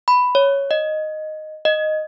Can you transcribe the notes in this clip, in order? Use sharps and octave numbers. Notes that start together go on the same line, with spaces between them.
B5
C#5
D#5
D#5